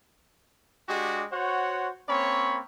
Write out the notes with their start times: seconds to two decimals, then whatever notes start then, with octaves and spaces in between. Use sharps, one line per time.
0.88 G#3 D4 F#4 G4
1.31 F#4 C5 C#5 F#5
2.08 A#3 C4 C#4 C#5 B5